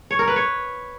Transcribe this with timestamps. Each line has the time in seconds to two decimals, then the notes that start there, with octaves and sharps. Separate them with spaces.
0.11 C#5
0.19 A#4
0.28 B4
0.36 C#5